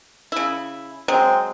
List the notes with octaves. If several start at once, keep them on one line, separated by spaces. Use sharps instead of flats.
C#3 E4
F#3 G#3 C4